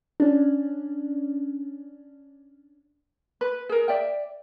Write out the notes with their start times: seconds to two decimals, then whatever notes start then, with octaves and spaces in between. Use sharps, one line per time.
0.20 C#4 D4
3.41 B4
3.69 G#4 A#4
3.88 D5 E5 G5